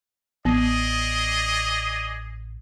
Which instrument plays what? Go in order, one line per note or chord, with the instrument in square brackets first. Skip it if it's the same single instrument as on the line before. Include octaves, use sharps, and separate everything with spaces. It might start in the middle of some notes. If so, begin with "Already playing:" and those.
[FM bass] A1 [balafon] B3 [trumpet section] G#4 D5 D#5